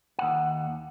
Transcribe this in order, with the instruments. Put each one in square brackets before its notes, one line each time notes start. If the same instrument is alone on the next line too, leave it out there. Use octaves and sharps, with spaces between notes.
[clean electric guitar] D#2 F#5